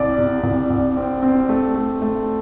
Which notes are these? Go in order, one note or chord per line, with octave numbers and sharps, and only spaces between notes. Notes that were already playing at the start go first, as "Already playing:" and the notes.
Already playing: C2 D5
C3
C2
C2
C4
C4
A3
A3
A3